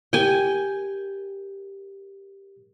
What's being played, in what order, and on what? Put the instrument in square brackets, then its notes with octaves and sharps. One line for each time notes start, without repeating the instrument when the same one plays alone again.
[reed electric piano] G4 A#4 [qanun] G5 G#5